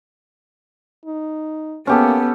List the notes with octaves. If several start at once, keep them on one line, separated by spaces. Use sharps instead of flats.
D#4
A#3 B3 C#4 G4 A4